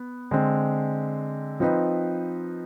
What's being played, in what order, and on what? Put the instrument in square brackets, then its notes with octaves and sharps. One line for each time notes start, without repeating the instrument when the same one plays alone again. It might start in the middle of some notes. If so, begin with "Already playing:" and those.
Already playing: [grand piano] B3
D3 G#3 C4
F3 C4 D#4 B4